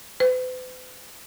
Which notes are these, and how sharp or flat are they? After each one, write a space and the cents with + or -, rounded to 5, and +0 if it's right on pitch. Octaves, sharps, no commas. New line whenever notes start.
B4 +45